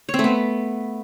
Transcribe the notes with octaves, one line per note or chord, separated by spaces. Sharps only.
C#5
C4
A3
B3